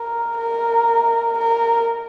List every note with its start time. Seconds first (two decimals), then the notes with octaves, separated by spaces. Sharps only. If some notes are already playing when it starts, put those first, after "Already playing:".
Already playing: A#4
0.38 A#4
1.38 A#4